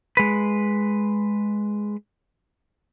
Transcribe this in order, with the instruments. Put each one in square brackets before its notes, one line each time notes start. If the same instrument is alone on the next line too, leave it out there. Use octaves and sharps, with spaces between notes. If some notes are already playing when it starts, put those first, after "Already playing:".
[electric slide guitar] G#3 B4